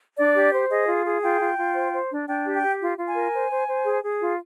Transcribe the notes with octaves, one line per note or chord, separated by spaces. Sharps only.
D4 D5
G4
C5
G#4 D#5
F4
G#4
F4 G5
F4
F4
C5
C5
D4
D4 G5
G4
G5
G4
F4
F4
G#5
A#4
C5
C5
C5
G#4
G#4
F4